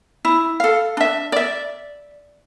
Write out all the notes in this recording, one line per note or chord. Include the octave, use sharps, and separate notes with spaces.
E4
A4 F5
D4 E5
D5 E5